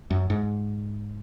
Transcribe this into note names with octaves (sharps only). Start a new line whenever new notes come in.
F#2
G#2